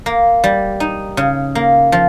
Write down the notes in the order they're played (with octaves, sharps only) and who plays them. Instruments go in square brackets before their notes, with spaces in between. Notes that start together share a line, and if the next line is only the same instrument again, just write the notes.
[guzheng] A#3
G3
D#4
C#3
A#3
F3